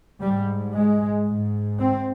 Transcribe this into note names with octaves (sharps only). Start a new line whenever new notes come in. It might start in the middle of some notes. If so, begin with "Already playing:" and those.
G#2 G3
G#3
G#2
C4